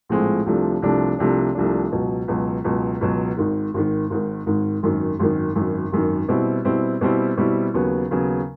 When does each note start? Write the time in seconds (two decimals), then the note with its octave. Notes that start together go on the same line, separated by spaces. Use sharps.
0.09 A#1 A2 F3 G#3 C4
0.46 C2 C3 F3 A3 D4
0.82 C2 C3 F3 A3 D4
1.19 C2 C3 F3 A3 D4
1.55 C2 C3 F3 A3 D4
1.91 C#2 B2 F#3
2.28 C#2 B2 F#3
2.64 C#2 B2 F#3
3.01 C#2 B2 F#3
3.37 G#1 G#2 D#3
3.74 G#1 G#2 D#3
4.10 G#1 G#2 D#3
4.46 G#1 G#2 D#3
4.83 G#1 F#2 D#3
5.19 G#1 F#2 D#3
5.56 G#1 F#2 D#3
5.92 G#1 F#2 D#3
6.28 B2 G3 C4 E4
6.65 B2 G3 C4 E4
7.01 B2 G3 C4 E4
7.37 B2 G3 C4 E4
7.74 D#2 C#3 F#3 B3
8.10 D#2 C#3 F#3 B3